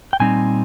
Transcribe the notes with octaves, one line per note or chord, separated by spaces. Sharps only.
G5
A#2 G3 C4 D#4 G#5